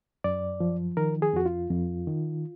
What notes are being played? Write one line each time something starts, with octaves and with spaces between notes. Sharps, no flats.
F#2 D5
F3
D#3 A#4
G#4
F2 F#4
F4
F2
D#3